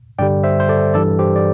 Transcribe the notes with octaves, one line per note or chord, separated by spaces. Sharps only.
G2 D3 G3 D5 G5
C5 E5
C5
A4 D5
G2 E3 G3 A4 D5
G4 C5
D5